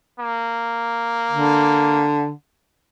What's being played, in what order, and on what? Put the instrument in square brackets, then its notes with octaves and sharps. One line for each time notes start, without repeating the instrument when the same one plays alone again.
[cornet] A#3
[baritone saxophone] D3